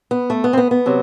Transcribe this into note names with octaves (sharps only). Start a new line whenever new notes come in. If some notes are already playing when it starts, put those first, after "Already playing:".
B3
A3
B3
C4
B3
B3
C3 F#3